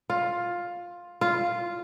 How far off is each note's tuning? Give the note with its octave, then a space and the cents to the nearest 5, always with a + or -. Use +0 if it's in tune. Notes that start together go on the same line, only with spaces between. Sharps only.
F4 +10
F4 -5